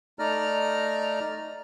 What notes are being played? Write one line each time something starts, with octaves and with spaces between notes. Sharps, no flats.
A3 D#4 D5 A#5 F6